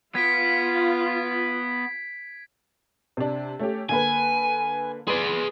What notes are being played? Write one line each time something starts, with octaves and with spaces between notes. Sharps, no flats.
B3 F4 G#6 B6 D7
C3 D4
A3 C#4 G4
D3 A#3 B4 G#5
G#4 B4 D5 C6